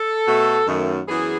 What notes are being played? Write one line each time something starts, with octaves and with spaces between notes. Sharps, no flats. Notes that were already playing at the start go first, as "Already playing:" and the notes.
Already playing: A4
B2 A3
F#2 D#3 A3
F#2 E3 B3 G#4